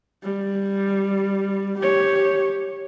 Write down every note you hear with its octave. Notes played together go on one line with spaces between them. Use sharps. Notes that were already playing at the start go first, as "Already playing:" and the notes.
G3
G4 C#5